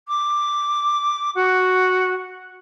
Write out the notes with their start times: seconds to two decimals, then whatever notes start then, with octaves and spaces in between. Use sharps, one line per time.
0.07 D6
1.34 F#4